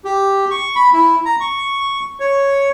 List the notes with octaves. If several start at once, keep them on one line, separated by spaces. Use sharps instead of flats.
G4
C#6
B5
E4
A#5
C#6
C#5